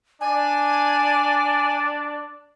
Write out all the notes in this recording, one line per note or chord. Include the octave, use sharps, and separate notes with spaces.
D4 D5 G#5